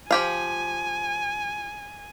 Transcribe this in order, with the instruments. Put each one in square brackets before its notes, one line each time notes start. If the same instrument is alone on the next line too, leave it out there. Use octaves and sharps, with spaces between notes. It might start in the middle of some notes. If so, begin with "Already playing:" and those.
[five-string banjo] F3 G4 F5 [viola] G#5